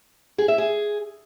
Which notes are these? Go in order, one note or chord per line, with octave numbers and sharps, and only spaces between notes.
G#4
E5
G#4